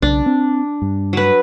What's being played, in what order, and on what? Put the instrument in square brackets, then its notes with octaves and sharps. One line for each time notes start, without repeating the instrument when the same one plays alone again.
[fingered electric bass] B1 C#3 [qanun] D4
[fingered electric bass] C4
G2
[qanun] F#3 B4